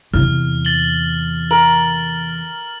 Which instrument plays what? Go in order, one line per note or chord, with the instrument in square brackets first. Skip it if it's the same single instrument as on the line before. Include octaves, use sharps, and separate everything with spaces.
[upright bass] E2 C3 [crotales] F6
[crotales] A6 F#7 G7
[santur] A#4 [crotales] F#7